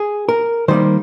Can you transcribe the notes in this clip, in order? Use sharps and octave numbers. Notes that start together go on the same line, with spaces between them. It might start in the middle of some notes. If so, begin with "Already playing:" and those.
Already playing: G#4
A#4
D#3 G3 A#3 C5